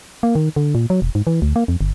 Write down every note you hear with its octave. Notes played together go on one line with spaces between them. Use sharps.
A#3
D#3
D3
A#2
F#3
E1
G#2
E3
D2
A#3
F2
G1